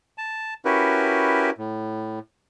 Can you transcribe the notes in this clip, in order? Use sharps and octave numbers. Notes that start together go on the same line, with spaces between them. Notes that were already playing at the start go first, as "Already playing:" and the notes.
A5
C#4 E4 F#4 G4 A#4 B4
A2